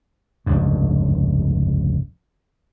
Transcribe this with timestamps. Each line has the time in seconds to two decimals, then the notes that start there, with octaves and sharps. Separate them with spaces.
0.46 F1 C#2 G2